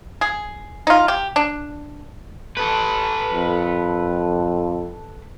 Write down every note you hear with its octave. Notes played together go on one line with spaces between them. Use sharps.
G#4
D#4 F4
G4
D4
A4 B4
F2